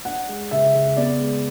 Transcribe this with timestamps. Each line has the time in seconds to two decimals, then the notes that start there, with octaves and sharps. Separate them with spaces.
0.05 D4 F#5
0.29 G#3
0.51 C#3 E5
0.75 C#3
0.96 B3 D5
1.20 G#3